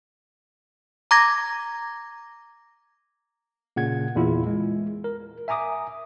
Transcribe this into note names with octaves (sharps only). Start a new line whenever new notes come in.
A#5 D6 G#6 A#6
A#2 C#3 F#5 G#6
E2 A#2 E4 F4
G#3
A#4
E5 G#5 A#5 D6 D#6